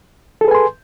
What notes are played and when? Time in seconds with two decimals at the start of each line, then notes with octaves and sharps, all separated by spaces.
0.41 A4
0.45 G#4
0.48 B4
0.51 G#5
0.55 C6